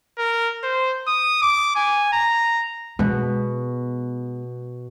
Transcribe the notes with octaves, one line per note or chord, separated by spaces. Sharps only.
A#4
C5
D#6
D6
G#5
A#5
B2 G#3 B3